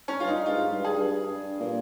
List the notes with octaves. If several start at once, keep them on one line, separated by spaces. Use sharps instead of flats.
C#4
G2 F4
D#4
G#2 F4
G2
G#4
G2
G2
A#2